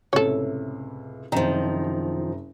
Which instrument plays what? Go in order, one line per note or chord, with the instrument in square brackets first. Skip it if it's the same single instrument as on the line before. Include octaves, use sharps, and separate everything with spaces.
[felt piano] C#2 A2 C3 [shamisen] A4 C#5
[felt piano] F#1 C3 A#5 [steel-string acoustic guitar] D#3 F3